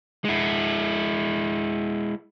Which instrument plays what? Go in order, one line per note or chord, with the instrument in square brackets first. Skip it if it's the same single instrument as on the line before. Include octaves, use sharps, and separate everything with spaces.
[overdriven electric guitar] G#3 E4